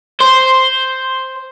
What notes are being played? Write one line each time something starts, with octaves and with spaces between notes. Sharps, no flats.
C5